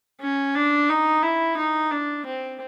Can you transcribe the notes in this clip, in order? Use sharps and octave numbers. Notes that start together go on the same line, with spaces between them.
C#4
D4
D#4
E4
D#4
D4
C4